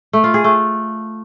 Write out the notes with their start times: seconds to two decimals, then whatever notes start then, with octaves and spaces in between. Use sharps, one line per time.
0.13 A3
0.24 F4
0.34 G#4
0.44 A3